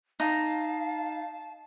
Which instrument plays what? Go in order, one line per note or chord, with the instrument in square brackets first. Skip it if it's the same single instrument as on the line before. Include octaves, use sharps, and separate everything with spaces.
[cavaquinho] D#4 [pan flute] F5 [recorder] A5